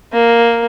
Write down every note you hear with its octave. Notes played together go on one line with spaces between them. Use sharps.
A#3